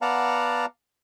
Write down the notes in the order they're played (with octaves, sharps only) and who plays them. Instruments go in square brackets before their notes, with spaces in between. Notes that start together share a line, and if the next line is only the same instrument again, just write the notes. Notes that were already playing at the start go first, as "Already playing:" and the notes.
[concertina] B3 D5 F5 F#5 A5 A#5